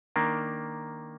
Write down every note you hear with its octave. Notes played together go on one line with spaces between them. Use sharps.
D#3 A#3 D4